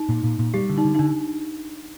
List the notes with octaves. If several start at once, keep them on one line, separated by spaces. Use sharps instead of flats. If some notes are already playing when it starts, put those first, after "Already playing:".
Already playing: D#4
A#2
A#2
A#2
G3 G4
D3
D#4
D3
D#4
D3 D4